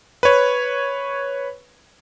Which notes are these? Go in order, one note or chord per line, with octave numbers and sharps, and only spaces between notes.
B4 C#5